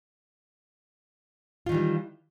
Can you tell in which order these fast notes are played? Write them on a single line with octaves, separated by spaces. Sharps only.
F4 D#3 E3 G3